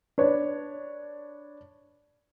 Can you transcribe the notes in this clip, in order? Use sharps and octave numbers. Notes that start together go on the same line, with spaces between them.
D4 B4 C#5